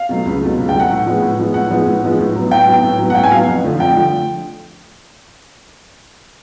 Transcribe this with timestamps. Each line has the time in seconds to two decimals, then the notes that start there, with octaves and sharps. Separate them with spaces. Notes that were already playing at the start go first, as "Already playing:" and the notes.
Already playing: F5
0.09 B2 F#3 A3
0.26 C#2
0.41 B2 F#3 A3
0.58 C#2
0.69 G5
0.74 B2 F#3 A3
0.80 F#5
0.90 A2
1.06 F3 G#3 B3
1.22 A2
1.39 F3 G#3 B3
1.54 A2 F#5
1.70 F3 G#3 B3
1.86 A2
2.03 F3 G#3 B3
2.19 A2
2.35 F#3 B3
2.51 A2 G5
2.67 F#3 B3
2.83 A2
2.99 F#3 B3
3.10 F#5
3.15 A2 G5
3.23 G#5
3.31 F#3 B3 F5
3.47 F2
3.64 D3 F3 A3
3.79 F2 G5
3.96 D3 F3 A3